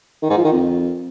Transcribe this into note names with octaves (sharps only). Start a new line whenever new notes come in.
D#3
G#2
F3
D#3
F2